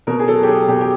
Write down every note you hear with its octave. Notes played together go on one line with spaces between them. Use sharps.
B2 A#4
G#4
F#3 A4
G4
F#3 G#4
B2 G4
G4